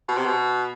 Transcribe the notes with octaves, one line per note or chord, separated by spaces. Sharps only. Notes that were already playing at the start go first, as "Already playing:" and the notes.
B2
C3
B2